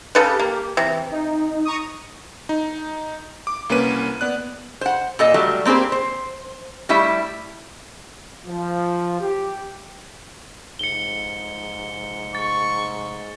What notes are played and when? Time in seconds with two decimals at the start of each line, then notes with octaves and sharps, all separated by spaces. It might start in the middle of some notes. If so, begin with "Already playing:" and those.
0.15 C#3 G4 A4 B4
0.40 A#3
0.77 C3 E3
1.11 D#4
1.65 A#5 C#6 D#6
2.49 D#4
3.47 D6
3.69 C2 A#3 C#4 B4 D#7
4.21 B3 D5 F#6
4.81 C5 F#5
5.19 A#2 A4 D#5
5.34 F#3 G3 A3
5.65 A#3 C4 G4 G#4 C5
5.92 C5
6.89 G3 A3 E4 E5
8.45 F3
9.21 G4
10.79 F1 G#2 C#7 G7
12.35 C#6 A6